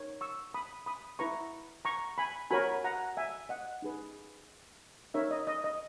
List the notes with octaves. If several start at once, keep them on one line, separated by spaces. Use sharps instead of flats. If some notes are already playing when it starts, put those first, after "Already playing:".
Already playing: D#4 A#4 C#5
C#6 E6
B5 D#6
B5 D#6
E4 B4 A#5 C#6
A#5 C#6
G#5 B5
F#4 A#4 C#5 G#5 B5
F#5 A#5
E5 G#5
D#5 F#5
D#4 G#4 B4
D#4 A#4 C#5 E5
D#5
D#5
D#5